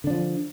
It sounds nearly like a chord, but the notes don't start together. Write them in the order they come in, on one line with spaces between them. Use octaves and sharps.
D3 D4 F3